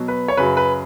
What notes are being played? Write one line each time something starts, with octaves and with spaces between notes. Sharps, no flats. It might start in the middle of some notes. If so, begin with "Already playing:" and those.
Already playing: B2 F#3
B4
C#5
F#2 C#3 F#3 B4
B4